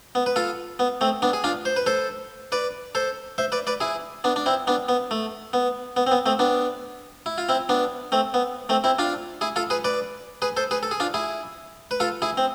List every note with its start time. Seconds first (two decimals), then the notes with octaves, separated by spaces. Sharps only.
0.15 B3
0.26 B4
0.36 F4 A4
0.79 B3
1.01 A3 C4
1.22 B3 D4
1.33 G#4
1.44 D4 F4
1.65 C5
1.76 B4
1.87 A4 C5
2.52 B4 D5
2.95 A4 C5
3.38 C5 E5
3.52 B4 D5
3.67 B4 D5
3.81 E4 G#4
4.24 B3 D4
4.36 D4
4.46 C4 E4
4.67 B3 D4
4.89 B3
5.11 A3
5.53 B3
5.97 B3
6.07 C4
6.12 B3
6.26 A3 C4
6.39 B3 D4
7.26 E4
7.38 F4
7.49 C4 E4
7.69 B3 D4
8.12 A3 C4
8.34 B3
8.69 A3 C4
8.84 C4 E4
8.99 D4 F4
9.41 E4 G#4
9.56 F4 A4
9.70 G#4 B4
9.84 B4 D5
10.42 G#4 B4
10.57 A4 C5
10.71 G#4 B4
10.83 A4
10.91 G#4
11.00 D4 F4
11.14 E4 G#4
11.91 B4
12.00 F4 A4
12.22 E4 G#4
12.37 C4